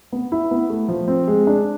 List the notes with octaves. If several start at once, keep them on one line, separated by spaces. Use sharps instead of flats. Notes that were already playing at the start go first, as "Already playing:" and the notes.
B3
E4
B3
A3
F3
C4
G#3
D4